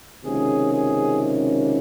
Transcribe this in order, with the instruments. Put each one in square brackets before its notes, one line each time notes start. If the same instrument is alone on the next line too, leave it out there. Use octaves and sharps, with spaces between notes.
[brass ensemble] C#2 C3 D#3 A#3 C#4 G#4
G#4